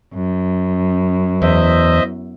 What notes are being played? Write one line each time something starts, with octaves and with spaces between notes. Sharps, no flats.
F#2
E2 C5 D#5 E5